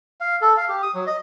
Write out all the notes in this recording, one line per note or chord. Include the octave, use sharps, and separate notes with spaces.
F5
A4
F5
G4
D#6
F#3
D#5